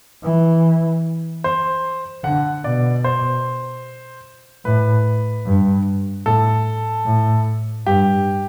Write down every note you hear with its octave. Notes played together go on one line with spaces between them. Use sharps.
E3
C5
D3 F#5
B2 D5
C5
A2 B4
G2
A2 A4
A2
G2 G4